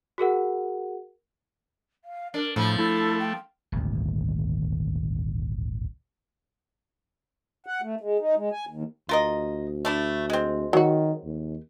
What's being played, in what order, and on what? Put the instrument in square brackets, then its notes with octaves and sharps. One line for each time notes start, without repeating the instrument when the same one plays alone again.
[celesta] F#4 G#4 A#4 F#5
[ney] F5
[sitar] D4 [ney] A#4
[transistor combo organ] A2 [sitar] F3 [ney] B5
[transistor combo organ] A3 [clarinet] E4 [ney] A4
[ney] G5
[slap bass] D#1 G#1 D2
[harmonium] F#5
A3
G#3
D#4
G#3
G#5
D#2
[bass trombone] D2 [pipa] F4 A#4 D#5
[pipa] A3 D4 E4
G#3 C4
[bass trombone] D#3 [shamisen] F#3 F#4
[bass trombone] D#2